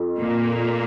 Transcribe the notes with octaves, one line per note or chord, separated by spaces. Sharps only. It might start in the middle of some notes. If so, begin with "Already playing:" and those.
Already playing: F2
A#2 A#3